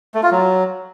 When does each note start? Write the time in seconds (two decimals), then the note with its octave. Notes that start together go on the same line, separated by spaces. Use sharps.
0.14 A3
0.23 F4
0.32 F#3